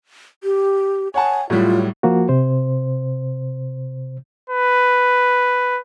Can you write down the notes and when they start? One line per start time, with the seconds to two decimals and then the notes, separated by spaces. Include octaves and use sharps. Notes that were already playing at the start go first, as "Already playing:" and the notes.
0.44 G4
1.14 C#5 F#5 G#5 A5
1.50 A2 F#3 G3 F4
2.03 F3 A#3 F#4
2.29 C3 C5
4.50 B4